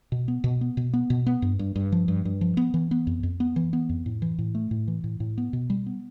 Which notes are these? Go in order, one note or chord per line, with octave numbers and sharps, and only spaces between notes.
B2
B3
B2
B3
B2
B3
B2
B3
G2
G2
G2
F3
G2
G2
F3
B3
E3
B3
F2
F2
B3
E3
B3
F2
A2
E3
A2
A3
A2
E3
A2
A2
B3
B2
G3
B3